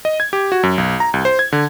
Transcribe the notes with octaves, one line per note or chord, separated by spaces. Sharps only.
D#5
G#6
G4
F#4
F#2
B1
A#5
C2
C5
G#6
D3